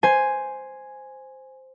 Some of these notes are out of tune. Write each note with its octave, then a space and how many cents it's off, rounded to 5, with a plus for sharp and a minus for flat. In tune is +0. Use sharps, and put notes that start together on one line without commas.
C5 +0 G#5 +0